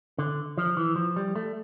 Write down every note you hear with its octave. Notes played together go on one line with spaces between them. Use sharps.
D3
F3
E3
F3
G3
A3